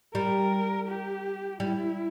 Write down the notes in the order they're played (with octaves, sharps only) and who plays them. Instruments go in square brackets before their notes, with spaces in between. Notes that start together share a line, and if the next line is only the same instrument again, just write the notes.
[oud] G3 [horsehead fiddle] A#4
[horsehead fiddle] G4
[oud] G3 [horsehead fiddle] E4